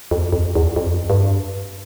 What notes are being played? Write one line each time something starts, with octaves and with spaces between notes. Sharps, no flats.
F2
F2
E2
F2
G2